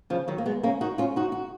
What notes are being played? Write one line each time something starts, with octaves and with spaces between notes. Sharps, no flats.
C#3 F3
D#3 F#3
A#3
G#3 B3
A#3 C#4
D#4 F#4
C#4 F4
D#4 F#4
F#4